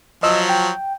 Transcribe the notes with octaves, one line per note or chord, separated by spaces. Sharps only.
F3 F#3 D#5 E6
G5